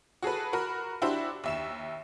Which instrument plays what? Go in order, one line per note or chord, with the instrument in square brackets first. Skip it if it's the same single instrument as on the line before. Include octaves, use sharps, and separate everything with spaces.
[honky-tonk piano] F#4 G#4 A4 B4
F#4 A#4 B5
D4 E4 F#4 G4 C5 E5
D#2 E5 E7